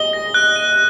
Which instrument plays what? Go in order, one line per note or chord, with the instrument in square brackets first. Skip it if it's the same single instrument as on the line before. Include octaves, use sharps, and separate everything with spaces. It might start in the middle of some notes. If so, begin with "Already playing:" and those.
Already playing: [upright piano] D#5 [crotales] G7
[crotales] A#6
F#6
D#7